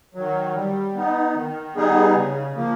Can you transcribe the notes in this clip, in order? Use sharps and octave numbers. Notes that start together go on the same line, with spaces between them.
D#3 F#3
G3
B3 D#4
D#3
G3 B3 D#4 G#4
C#3
F3 A#3